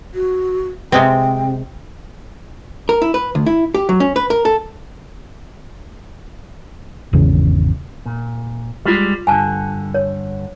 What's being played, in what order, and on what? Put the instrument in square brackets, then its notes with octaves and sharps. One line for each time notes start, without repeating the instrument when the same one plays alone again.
[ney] F#4
[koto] C3 G#3 C4 [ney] G5
[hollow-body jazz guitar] A#4
E4
B4
D2
E4
G4
F#3
C#4
B4
A#4
A4
[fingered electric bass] G#1 E2 C#3
[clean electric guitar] A#2
[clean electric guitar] G3 G#3 [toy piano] F4 G4
[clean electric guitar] G2 D3 [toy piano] G#5 A5
[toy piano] C#5